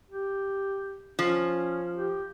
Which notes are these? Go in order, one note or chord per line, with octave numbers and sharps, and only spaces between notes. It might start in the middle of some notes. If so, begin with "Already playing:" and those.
G4
F3 C#4
G4